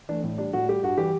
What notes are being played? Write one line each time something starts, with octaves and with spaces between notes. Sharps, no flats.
E3 A3 D4
A2
G3 D4
A2 F#4
G3 G4
G2 F#4
E3 G3 G4